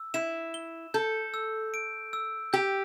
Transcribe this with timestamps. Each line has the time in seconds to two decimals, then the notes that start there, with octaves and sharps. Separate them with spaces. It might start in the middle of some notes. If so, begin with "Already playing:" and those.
Already playing: E6
0.14 E4 E7
0.54 G7
0.94 A4 G6
1.34 E6
1.74 D7
2.13 E6
2.53 G4 G6